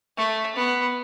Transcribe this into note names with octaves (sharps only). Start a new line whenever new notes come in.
A3
B3